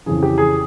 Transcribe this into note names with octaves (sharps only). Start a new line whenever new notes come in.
F2 C#3 E3 G#4
G4
G#4